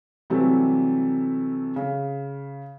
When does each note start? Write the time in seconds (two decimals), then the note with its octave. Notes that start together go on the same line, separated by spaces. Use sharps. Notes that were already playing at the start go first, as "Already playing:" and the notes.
0.30 C3 E3 F#3 G3 A3 C4
1.76 C#3